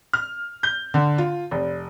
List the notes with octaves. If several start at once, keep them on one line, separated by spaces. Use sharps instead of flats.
F6
G6
D3
F4
F1